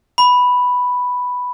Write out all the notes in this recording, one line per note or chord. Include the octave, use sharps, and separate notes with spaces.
B5